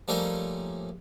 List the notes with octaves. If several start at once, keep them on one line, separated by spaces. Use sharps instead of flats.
F3 G3 A3 A#3 C#4 D#4